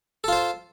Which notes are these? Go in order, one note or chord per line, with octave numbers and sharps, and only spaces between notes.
F4 A4 C5